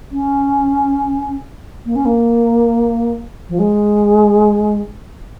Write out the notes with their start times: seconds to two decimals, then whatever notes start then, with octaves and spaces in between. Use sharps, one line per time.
0.11 C#4
1.85 A#3
1.95 C#4
2.05 A#3
3.49 F3
3.59 G#3